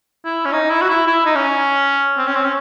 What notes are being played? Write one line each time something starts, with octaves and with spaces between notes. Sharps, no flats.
E4
C#4
D#4
E4
F#4
E4
E4
D#4
C#4
C4
C#4
C4
C#4